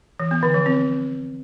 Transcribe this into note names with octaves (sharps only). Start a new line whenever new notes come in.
E3
B3
D3
F3
C4